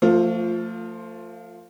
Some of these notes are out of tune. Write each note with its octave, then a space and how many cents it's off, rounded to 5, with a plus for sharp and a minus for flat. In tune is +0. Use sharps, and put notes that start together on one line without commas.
F3 +0 A3 +40 F4 +10